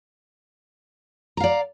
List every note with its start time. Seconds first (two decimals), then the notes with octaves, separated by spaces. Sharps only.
1.37 A#5
1.40 F5
1.44 D5